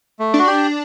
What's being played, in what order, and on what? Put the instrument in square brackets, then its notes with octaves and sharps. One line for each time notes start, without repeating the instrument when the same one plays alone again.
[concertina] A3
[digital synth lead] D4 [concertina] F#4
[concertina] G4